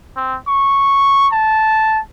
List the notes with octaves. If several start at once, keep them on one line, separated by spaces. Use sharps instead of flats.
C4
C#6
A5